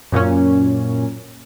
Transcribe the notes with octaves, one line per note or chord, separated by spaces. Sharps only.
F#2 A#2 A#3 C#4